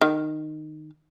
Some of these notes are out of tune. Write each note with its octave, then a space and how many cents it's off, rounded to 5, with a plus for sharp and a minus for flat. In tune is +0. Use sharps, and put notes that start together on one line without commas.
D#3 -15